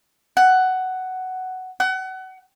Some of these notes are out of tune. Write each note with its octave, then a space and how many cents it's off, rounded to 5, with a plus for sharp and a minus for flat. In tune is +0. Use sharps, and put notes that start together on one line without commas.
F#5 +10
F#5 +30